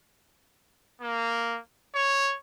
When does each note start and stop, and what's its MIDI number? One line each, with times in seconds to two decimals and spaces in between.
1.01 1.59 58
1.94 2.35 73